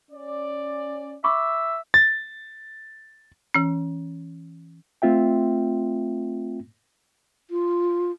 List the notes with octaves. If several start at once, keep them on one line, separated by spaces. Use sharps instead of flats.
C#4 D5
E5 B5 C#6 D6
A6
E3 C#4
A3 C4 F4 E5 G5
F4